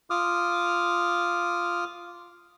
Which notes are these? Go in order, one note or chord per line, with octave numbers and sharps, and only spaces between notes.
F4 D6 D#6 F6